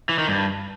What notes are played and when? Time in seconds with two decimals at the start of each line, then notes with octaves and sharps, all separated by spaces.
0.09 E3
0.18 D#3
0.28 G2